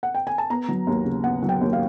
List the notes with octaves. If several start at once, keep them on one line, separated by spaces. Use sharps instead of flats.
F#5
G5
G#5
A5
B3 A#5
F#3
D#2
C#3
B3 F#5
F#3
G5
D#2
F5